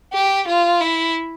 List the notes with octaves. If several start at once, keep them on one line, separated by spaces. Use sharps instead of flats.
G4
F4
E4